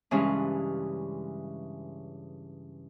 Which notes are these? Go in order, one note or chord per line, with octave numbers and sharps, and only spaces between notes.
G2 C#3 E3 G#3 C#4